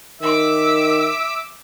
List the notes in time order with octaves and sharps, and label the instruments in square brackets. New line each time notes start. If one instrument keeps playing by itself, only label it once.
[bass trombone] D#3 [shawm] E5 [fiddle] D6 E6